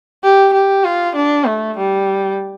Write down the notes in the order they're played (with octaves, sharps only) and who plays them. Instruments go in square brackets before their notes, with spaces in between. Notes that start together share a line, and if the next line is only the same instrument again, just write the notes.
[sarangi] G4
G4
F4
D4
A3
G3